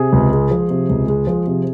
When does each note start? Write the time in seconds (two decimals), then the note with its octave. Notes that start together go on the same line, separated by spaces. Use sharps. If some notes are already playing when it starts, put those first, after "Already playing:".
Already playing: C3 G#4
0.13 C#2
0.32 G#3
0.51 F3
0.70 C3
0.89 C#2
1.08 G#3
1.27 F3
1.47 C3